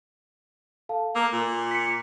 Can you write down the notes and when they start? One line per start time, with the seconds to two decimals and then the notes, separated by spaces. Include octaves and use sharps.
0.89 A4 F5 A5
1.15 A#3 D6 E6
1.33 A#2
1.71 B6 C#7